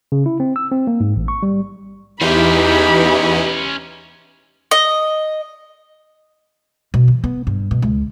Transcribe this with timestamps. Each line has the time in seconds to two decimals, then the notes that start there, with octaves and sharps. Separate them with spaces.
0.12 C#3
0.26 E4
0.40 C4
0.56 E6
0.72 C4
0.87 A#3
1.00 G#2
1.16 A1
1.28 C#6
1.43 G3
2.21 E2 E3 C#4 D#4 G4 C5 B5
4.71 D#5
6.94 B2
7.08 E3
7.24 B3
7.47 G2
7.71 B2
7.82 C#2